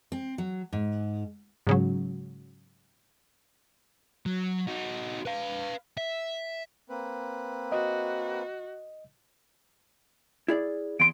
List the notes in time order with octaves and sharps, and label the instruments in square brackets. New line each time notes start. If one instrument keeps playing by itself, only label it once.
[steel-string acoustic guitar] C4
F#3
G#2
[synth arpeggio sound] G#2 C#3 F#3
[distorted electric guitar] F#3
D#4 F#4
B4 F5
E5
[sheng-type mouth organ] A#3 C4 B4
[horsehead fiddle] F#4 [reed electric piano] D#5
[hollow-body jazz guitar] E4 G#4 D5
[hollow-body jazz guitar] E2 C6 [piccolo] D7